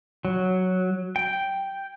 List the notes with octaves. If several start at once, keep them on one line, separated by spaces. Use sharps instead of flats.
F#3
G5